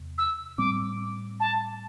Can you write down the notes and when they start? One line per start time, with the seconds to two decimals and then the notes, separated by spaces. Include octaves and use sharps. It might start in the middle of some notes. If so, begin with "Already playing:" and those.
Already playing: E2 C3
0.18 E6
0.58 A2 G3 C4 D6
1.40 A5